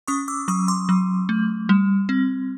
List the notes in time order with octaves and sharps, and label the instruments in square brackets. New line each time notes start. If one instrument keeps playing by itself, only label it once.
[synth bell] C#4 C#6 D#6
D6 E6
F#3 C#6 D#6
C6 D6
F#3
A3
G3
C4